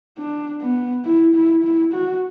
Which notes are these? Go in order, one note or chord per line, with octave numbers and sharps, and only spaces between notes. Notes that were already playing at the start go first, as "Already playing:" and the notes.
D4
B3
E4
E4
E4
F#4